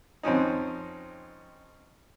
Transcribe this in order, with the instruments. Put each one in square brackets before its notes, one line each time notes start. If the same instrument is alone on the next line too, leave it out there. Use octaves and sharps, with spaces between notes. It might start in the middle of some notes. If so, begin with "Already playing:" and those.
[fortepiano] F2 C4 C#4 D#4